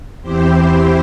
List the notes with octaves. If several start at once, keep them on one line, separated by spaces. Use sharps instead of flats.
E2 E3 C4 E4 G4 C5